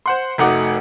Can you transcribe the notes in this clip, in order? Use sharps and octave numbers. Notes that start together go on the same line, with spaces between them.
C5 F#5 C6
F1 A3 D#4 F#4 F#5 D6